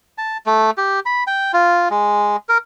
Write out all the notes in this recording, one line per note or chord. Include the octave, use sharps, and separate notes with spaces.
A5
A3
G4
B5
G5
F4
G#3
A#4